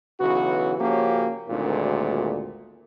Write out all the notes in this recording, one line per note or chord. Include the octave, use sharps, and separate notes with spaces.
B1 C#3 E3 B3 F#4
C#3 F3 A#3 C#4 F#4 G4
G#1 D2 A#2